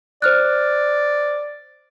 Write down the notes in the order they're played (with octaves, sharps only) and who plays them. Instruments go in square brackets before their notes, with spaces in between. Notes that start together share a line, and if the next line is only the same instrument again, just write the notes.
[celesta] C5 F6 F#6 [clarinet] D5